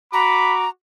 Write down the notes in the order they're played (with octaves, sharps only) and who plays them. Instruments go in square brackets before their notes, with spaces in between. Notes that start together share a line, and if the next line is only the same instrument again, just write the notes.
[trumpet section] F#4 D6 [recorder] A#5 [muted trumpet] B5